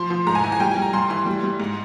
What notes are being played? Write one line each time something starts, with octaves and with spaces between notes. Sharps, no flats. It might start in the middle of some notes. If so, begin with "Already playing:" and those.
Already playing: F3 C6
F3
G#2 A#5
G#5
E3 A#5
G#5
G3 G5
G#5
G3
A#5
G2 C6
E3 C6
G3
G3
G#2